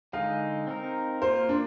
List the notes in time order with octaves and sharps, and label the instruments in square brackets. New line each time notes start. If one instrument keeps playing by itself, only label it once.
[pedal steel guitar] D3 G#3 D#4 G#4 [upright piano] F5
[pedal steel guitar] C4 D#4 A#4
[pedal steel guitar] A#3 F4 A#4 [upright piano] C5
[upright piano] D4